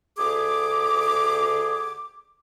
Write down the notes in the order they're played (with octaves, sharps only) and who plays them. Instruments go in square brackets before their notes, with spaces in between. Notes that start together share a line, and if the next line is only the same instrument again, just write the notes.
[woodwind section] D2 G#4 D6